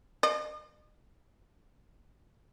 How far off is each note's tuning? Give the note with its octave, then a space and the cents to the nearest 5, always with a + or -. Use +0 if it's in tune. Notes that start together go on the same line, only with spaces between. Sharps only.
D#5 -45